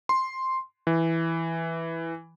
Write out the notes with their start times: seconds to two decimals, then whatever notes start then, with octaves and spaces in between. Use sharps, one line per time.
0.09 C6
0.87 E3